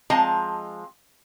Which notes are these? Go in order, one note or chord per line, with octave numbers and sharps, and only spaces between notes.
F3 G#3 C4 D#5 A5 A#5